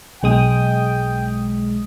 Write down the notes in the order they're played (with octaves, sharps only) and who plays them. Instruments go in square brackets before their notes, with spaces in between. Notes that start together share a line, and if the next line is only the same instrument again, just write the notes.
[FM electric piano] B1 G#3 D#6 [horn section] G5